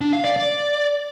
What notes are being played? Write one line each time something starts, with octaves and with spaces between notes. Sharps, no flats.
D4
F5
D5
D5